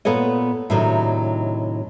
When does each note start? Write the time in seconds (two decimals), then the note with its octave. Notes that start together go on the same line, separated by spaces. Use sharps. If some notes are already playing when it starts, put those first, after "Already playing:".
0.05 A#2 B3 A4 C#5 D#5
0.70 A2 C3 D#3 F#3 D4 D#4